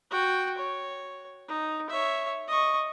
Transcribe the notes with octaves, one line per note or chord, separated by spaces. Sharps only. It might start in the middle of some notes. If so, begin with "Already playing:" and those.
F#4 G5
C#5
D#4
C#5 E5
D#5 C#6